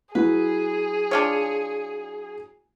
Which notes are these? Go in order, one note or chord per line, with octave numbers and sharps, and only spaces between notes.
F#3 E4 G#4 B4
D4 F4 C#5